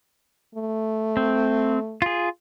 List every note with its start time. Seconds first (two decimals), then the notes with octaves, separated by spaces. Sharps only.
0.55 A3
1.17 C4
2.02 F4 G#4